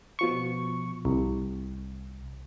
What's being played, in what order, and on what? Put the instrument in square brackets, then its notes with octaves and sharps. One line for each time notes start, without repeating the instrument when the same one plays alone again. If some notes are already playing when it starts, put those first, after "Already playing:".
[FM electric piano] B2 F3 C#6
C2